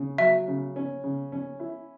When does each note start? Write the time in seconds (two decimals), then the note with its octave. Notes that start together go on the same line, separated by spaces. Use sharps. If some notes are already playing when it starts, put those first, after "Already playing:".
Already playing: C#3
0.18 F#3 E5
0.48 C#3
0.76 C#4
1.04 C#3
1.32 C#4
1.60 E4